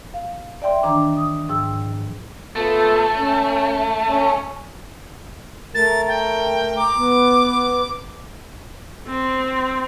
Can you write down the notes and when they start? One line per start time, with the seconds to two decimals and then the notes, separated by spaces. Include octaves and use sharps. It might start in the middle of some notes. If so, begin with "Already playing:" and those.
0.14 F5
0.62 D5 E5 G5 C6
0.83 D#3 E3 D4 A#5 D6
1.17 D#6
1.49 G#2 F3 G5 E6
2.56 A3 B3 F4 A4
3.15 C#4
4.08 C#4
5.75 A3 A#4 A6
6.08 G5
6.77 A#5 D6
6.96 B3
9.08 C4